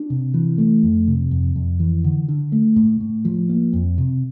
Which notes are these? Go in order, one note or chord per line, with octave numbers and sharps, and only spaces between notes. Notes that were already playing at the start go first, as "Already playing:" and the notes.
Already playing: D4
C3
E3
A3
F2
C3
F2
F2
E3
D3
D3
A3
A2
A2
F3
A#3
F2
C3